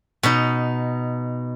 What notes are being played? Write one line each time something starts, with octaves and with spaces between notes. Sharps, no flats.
B2 D#4